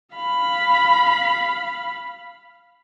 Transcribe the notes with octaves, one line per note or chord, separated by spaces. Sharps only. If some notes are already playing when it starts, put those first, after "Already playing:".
F5 B5